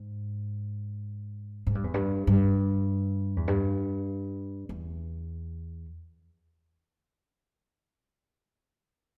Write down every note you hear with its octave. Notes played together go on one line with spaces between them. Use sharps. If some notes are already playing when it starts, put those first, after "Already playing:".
Already playing: G#2
G#2
G2
E2
G2
G2
E2
G2
E2